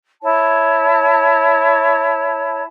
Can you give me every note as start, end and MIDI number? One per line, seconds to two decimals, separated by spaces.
0.22 2.63 64
0.22 2.63 73
0.22 2.63 81